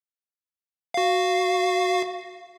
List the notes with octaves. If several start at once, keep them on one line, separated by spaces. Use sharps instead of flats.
F#4 F5